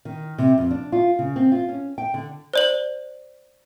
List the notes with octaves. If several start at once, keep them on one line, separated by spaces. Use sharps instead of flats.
D#3
C3
F2
D4
F4
C#3
C4
F4
C#4
G5
D3
C5 D5 F#7